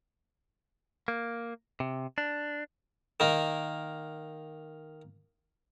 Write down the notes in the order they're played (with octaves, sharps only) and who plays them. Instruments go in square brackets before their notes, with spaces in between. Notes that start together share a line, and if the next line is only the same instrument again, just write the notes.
[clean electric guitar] A#3
C3
D4
[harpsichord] D#3 A#3